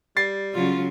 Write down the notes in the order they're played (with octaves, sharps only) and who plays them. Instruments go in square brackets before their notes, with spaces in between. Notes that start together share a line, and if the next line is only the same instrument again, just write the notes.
[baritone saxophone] G3 [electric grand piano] A6 C7
[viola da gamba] C#3 F#3 C#4 [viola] F4